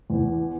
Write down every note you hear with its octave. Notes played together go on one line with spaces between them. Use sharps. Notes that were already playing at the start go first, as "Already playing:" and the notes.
E2